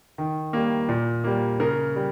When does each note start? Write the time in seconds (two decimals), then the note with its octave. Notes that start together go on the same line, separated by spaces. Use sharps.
0.18 D#3
0.53 G3 A#3
0.89 A#2
1.24 G3 A#3
1.60 C#3 A#4
1.96 G3